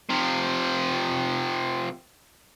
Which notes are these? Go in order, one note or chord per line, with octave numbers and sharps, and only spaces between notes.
C3 F3